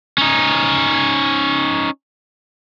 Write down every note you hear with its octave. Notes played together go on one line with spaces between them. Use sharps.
C#4 D#4